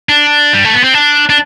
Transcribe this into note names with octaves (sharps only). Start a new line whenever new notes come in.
D4
G3
A3
B3
C4
D4
D4